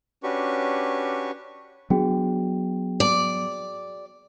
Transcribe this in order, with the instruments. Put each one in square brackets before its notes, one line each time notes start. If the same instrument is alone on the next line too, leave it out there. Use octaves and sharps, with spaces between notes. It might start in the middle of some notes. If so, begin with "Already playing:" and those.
[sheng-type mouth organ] C#4 D4 F#4 G4 B4 C#6
[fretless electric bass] F#3 B3 D4 [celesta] F#4 G#4 G5
[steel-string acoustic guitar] D5